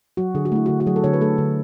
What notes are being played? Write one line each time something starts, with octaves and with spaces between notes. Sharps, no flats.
F#3 F#4
D3 G#4
F#4
A3 E4
D3 F#4
F#4
F#3 G#4
A4
D3 C#5
B4
A3 A4
D3